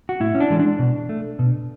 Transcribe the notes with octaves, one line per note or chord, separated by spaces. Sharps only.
F#4
A2 E4
C#4
D4
E3 G#3
D4
B2
A3
B2